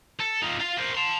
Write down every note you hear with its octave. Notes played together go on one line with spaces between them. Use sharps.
A4
D#4 F4
F4 F5
A#4 C5
A5 C6